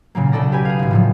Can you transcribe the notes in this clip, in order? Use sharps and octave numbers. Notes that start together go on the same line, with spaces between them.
A#2 C#3 F#3 A#3
B1 C#3 A4 D5 A#6
G4 B4 G#5
G#4 F5
G#1 A2
A2 F3 F#3